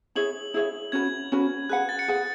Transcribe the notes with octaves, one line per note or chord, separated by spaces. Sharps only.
E4 G#4 C#5 E5 F#7
E4 G#4 C#5 E5
C#4 F#4 B4 G#6
C#4 F#4 B4
G#4 B4 F#5 F#6
A6
C#7
G#4 B4 F#5